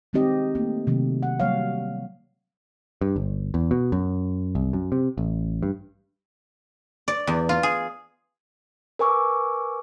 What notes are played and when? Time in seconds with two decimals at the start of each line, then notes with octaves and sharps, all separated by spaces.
0.13 D#3 G#3 C4 D#4 G4 D#5
0.55 A3 A#3
0.87 C3 D#3 F#3 A3
1.23 F#5
1.40 F#3 G3 A#3 C#5 F5
3.01 G2
3.16 G1
3.54 E2
3.71 B2
3.92 F#2
4.55 C2
4.73 F#2
4.92 C3
5.18 A1
5.63 G2
7.08 D5
7.27 E2
7.49 F4
7.63 G#4
8.99 A#4 B4 G#5 C#6 D6 E6